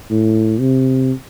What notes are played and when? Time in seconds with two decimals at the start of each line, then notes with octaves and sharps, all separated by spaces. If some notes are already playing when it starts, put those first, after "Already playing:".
0.10 A2
0.59 C3